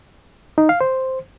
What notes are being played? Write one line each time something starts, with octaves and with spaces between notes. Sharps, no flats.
D#4
F5
C5